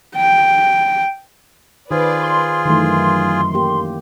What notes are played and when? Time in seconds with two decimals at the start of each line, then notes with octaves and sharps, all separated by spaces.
0.16 G5
1.91 D#3 F4 G#4 B4 C5 D5
2.23 C6
2.66 F#2 D#3 E3 A3
3.54 A#3 G4